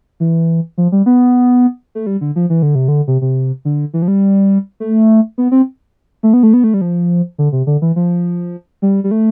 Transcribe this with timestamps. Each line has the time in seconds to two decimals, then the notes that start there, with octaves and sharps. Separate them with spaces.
0.20 E3
0.78 F3
0.92 G3
1.06 B3
1.95 A3
2.06 G3
2.21 D3
2.36 F3
2.50 E3
2.62 D3
2.75 C3
2.88 D3
3.07 C3
3.22 C3
3.65 D3
3.93 E3
4.02 F3
4.08 G3
4.80 A3
5.38 B3
5.52 C4
6.23 A3
6.33 B3
6.43 A3
6.53 B3
6.64 A3
6.74 G3
6.81 F3
7.38 D3
7.52 C3
7.67 D3
7.82 E3
7.96 F3
8.82 G3
9.04 G3
9.11 A3